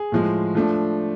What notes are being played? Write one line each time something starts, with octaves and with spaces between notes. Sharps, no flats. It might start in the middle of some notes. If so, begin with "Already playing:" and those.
Already playing: G#4
A2 F3 G#3
F3 A3 D4